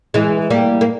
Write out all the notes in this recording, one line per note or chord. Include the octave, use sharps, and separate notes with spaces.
E3 G#3
G3 A#3
A#3